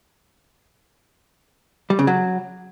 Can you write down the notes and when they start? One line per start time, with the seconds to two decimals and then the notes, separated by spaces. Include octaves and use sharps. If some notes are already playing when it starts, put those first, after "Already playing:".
1.90 G3
1.99 C#3
2.07 F#3